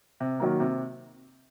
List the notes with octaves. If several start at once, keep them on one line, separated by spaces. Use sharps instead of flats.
C3
D#3 F#3 A#3
C3